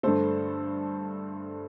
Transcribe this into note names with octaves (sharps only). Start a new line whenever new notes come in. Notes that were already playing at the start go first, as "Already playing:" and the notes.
G2 D3 A3 A4 C5